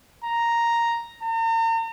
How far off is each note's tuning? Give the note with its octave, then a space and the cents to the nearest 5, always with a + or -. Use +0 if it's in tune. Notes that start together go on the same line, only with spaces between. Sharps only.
A#5 +0
A#5 -40